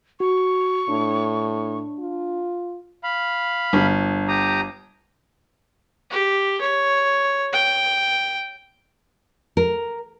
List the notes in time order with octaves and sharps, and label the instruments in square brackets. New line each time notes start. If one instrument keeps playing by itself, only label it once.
[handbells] F#4 [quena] C#6
[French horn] A2 [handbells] D4
[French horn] F4
[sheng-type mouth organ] F5 B5
[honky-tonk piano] G1
[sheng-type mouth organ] G4 A#5 D#6
[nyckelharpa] G4
C#5
G5
[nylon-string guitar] A#4